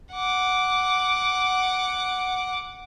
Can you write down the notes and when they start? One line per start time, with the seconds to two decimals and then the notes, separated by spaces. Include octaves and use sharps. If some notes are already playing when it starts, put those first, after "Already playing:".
0.13 F#5 D6